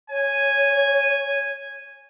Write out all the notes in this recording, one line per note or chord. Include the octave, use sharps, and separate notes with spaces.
C#5 G#5